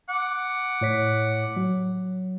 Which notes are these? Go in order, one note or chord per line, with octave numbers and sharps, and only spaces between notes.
F#5 D6
A2 C#5 B6
F#3